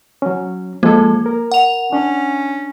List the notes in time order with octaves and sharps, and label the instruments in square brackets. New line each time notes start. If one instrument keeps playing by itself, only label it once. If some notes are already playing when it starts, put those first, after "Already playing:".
[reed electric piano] F#3 C#4
[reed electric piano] F3 G#3 A4 [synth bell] A#3
[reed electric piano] A#4
[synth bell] F#5 F7
[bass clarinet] C#4 [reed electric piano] D4